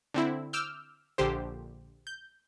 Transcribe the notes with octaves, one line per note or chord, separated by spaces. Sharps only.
D3 C4 E4
D6 E6 F6 G6
A#1 D3 G4 C5
G6